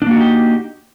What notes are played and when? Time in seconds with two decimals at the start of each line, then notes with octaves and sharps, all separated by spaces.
0.02 D4
0.06 A#3
0.11 F#4
0.16 D#4
0.21 G4